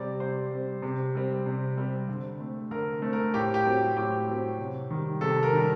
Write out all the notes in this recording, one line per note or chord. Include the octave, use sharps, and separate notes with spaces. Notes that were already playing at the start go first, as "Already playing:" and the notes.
Already playing: C3 G3 C4 D5
C3 C5
G3 C4
C3
G3 C4
C3
G3 C4
D3
A3 C4
D3 A#4
A3 C4
A#4
A2 G4
G4
F#3 C4
A2 G4
F#3 C4
C3
D#3 G3
C3 A4
A#4
D#3 G3